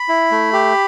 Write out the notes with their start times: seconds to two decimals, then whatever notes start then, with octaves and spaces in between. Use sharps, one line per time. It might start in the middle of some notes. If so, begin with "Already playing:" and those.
Already playing: B5
0.08 E4
0.31 A3
0.53 G4